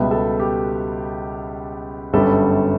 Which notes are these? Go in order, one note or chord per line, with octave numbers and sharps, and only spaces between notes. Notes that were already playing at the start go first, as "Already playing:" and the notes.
Already playing: C#2 B2 G3 B3 E5
A4
G4
G1 F#2 D3 G3 B3 A4